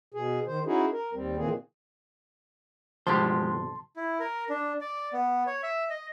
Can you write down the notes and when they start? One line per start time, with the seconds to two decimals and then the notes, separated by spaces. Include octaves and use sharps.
0.14 B2 G#4
0.47 D#3 C5
0.66 C#4 D#4 E4 F#4 G#4
0.92 A#4
1.13 D#2 G3 C4
1.38 A#2 D#3 E3 A#3 C4 G#4
3.07 B1 G2 F3 G#3 G4 C5 A5 C6
3.96 E4
4.20 A#4
4.50 D4
4.81 D5
5.13 B3
5.47 C#5
5.63 E5
5.90 D#5